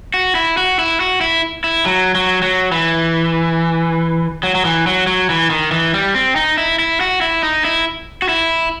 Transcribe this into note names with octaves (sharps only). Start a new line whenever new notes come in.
F#4
E4
F#4
E4
F#4
E4
E4
F#3
F#3
F#3
E3
F#3
F#3
E3
F#3
F#3
E3
D#3
E3
G3
C4
D#4
E4
E4
F#4
E4
D#4
E4
F#4
E4